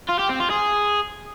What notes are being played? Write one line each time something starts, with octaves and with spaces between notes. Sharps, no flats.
F4
G4
C4
F4
G#4